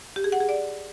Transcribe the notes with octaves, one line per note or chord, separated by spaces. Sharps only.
G4
G#4
F#5
G#4
D5